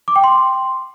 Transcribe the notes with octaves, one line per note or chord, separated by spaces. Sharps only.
D6
G5
C6